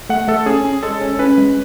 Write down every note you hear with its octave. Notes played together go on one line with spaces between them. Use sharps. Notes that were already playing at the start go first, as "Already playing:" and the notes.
A3 F#5
A3 A4
C#4 G#4
C#4
G#3 A4
C#4
C#4 B4
G#3